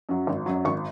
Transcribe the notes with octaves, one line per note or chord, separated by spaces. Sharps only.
F#2 F#3
G#1
F#2 F#3
G#1 C#6